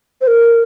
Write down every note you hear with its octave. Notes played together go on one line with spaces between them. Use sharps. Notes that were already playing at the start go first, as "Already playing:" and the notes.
C5
A#4